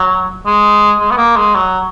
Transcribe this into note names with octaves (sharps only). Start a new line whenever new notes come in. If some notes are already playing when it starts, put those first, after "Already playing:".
Already playing: F#3
G#3
G#3
B3
A#3
G#3
F#3